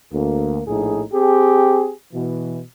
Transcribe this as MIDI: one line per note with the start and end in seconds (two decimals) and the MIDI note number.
0.12 0.61 38
0.12 0.61 58
0.67 1.03 34
0.67 1.03 45
0.67 1.03 63
0.67 1.03 68
1.12 1.91 60
1.12 1.91 67
1.12 1.91 68
2.13 2.61 47
2.13 2.61 52